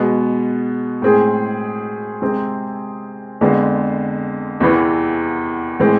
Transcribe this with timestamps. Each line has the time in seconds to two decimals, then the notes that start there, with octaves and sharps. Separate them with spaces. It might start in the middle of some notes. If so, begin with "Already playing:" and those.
Already playing: B2 G#3 B3
1.02 A2 G#3 C4 G#4
2.22 C3 G#3 C4 G#4
3.41 F2 D3 G#3 B3 F4
4.60 E2 C3 E3 B3
5.80 A2 E3 G#3 C4